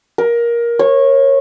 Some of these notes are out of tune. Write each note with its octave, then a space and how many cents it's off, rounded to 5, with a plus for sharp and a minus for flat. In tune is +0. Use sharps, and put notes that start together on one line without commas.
A#4 +15
C#5 -20